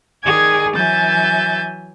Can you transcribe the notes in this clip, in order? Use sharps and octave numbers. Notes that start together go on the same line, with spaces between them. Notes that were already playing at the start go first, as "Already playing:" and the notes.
D#3 G#4 D5 G#5 G#6
E3 F#3 E5 G#5 G6 A6